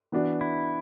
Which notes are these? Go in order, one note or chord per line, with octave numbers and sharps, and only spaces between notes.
E3 B3 D4 F#4
E4